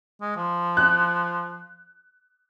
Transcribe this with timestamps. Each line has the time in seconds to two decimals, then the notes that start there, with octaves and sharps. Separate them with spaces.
0.21 G#3
0.36 F3
0.77 F#6